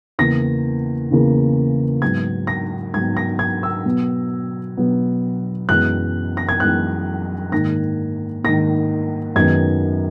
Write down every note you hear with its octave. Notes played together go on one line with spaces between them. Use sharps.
E2 C#3 E3 A#3 A#6
E2 C#3 E3 A#3
G#2 F#3 B3 G#6
A#6
G#2 F#3 B3 G#6
A#6
G#6
E6
B2 F#3 B3
B2 F#3 B3
F#2 E3 G#3 B3 F#6
A#6
G#6
F#2 E3 G#3 B3 F#6
G#2 D#3 A#3 A#6
G#2 D#3 A#3 A#6
F#2 D#3 G#3 B3 G#6